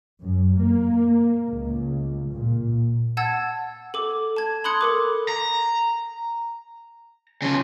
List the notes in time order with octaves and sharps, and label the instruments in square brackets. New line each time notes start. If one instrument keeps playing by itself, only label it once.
[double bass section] F#2
A#3
C#2
A#2
[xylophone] F#5 A5 E6 G#6 A6
A4 D6
A5 G#6
B5 C6 D#6 F#6 G#6 C#7
A4 A#4 D6
[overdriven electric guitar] A#5
C#3 F3